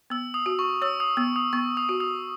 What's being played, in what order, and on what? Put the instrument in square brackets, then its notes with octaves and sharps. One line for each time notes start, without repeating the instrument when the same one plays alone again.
[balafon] B3 [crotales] E6
[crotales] D#6
[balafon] F#4
[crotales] C#6
[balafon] C#5 [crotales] E6
[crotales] D#6
[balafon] B3 [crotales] E6
[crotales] D#6
[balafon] B3 [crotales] C#6
[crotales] D#6
[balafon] F#4
[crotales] D#6